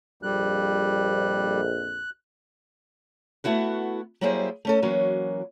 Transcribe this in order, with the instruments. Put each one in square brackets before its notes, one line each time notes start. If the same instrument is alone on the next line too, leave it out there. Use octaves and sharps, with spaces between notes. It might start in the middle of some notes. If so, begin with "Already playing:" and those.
[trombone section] A#1 F2 [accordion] G3 [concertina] F#6
[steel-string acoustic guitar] A3 B3 E4 F#4 F#5
F#3 G3 A#3 E4 G#4 C5
A3 C#4 A4
E3 F#3 A#3 C#4 F#4